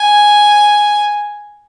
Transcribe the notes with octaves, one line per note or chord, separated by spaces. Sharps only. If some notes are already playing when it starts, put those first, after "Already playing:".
Already playing: G#5